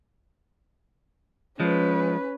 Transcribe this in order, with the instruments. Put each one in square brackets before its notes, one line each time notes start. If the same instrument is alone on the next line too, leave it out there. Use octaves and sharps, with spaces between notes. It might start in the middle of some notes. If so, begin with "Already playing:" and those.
[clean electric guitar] F3 G#3 [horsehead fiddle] C#4 B4